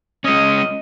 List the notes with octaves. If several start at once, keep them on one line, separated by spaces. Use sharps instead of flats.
G#3 C#4 D#5